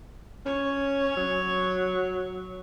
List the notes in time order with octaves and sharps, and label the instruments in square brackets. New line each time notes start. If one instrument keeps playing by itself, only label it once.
[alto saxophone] C#4 [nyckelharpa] C#5
[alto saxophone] F#3